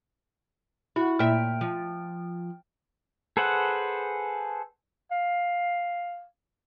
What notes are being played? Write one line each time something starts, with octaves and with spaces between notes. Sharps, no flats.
E4 F#4
A#2 E5 G5 F6
F3
G#4 A4 B4 C5 F#5
F5